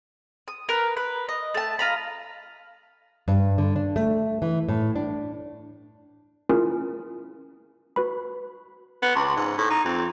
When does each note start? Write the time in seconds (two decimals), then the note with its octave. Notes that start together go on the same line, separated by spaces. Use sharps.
0.48 D#6
0.69 A#4 B4
0.97 B4
1.29 D#5
1.54 A3 A5
1.79 F4 A#5 B5
3.28 G2
3.58 D3
3.76 D4
3.96 A3
4.42 E3
4.69 A2
4.96 D4
6.49 C#4 E4 F4 G#4 A#4
7.96 F#4 B4 B5
9.02 B3
9.15 C#2
9.36 G#2
9.58 A2
9.70 D#4
9.84 F2